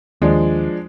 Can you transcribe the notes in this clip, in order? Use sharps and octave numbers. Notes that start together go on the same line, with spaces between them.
D#2 F3 G#3 D4